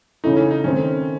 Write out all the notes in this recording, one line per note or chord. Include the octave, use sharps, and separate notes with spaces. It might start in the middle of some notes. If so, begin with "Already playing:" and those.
C#3 E3 A3 D#4
C#4
D#4
D#3 A3 C4 C#4